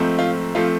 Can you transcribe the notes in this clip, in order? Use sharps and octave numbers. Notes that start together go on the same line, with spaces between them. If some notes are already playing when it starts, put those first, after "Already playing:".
Already playing: G#2 F3 A3 C4
F4
F3 A3 C4 F4